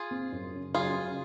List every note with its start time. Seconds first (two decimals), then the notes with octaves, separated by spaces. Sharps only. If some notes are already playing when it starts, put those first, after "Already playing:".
Already playing: F4 G#4
0.11 C4
0.32 F#2
0.53 C#3
0.74 F#3 F4 G#4
0.96 C#3